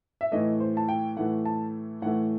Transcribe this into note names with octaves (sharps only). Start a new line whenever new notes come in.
E5
A2 E3 A3 D#5
C5
A5
G5
A2 E3 A3 F#5
A5
A2 E3 A3 F#5